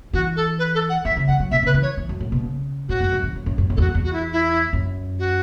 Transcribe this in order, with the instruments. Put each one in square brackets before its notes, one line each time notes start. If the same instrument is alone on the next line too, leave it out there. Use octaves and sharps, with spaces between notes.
[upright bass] E3 [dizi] F#4
[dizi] A4
B4
A4
F#5
[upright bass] E3 [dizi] E5
[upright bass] C#3
[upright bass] E3 [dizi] F#5
[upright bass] F#3
[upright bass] B2 [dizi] E5
[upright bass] C#3 [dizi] B4
[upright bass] E3
[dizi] C#5
[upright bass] E3
F#2
A2
B2
C#3
[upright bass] A2 [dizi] F#4
[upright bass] F#2
F#2
E3
F#2
F#2
F#2
F#2
[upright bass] E2 [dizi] F#4 A4
[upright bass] E2
[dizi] F#4
E4
E4
[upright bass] F#2
[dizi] F#4